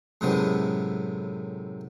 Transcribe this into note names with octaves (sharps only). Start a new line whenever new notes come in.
F#2 A2 C3 G#3 A3 B3